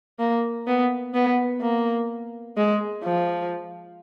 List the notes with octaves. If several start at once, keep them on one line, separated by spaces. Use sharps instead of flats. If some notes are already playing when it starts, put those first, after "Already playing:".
A#3
B3
B3
A#3
G#3
F3